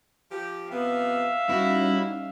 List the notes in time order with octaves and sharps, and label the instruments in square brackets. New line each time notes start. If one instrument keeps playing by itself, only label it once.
[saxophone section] F3 G4
[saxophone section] C3 F3 B3 [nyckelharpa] E5 F5
[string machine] G3 C#4 D#4 [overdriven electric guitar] E4 [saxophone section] F#4